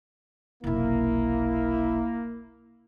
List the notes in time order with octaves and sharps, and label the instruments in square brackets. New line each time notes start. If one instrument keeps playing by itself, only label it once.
[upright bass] F1 B1 [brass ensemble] A#3 [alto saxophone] E4